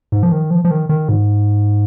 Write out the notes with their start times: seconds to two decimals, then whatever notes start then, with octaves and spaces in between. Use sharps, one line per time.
0.12 G#2
0.23 F3
0.32 D#3
0.51 F3
0.65 F3
0.71 D#3
0.89 D#3
1.09 G#2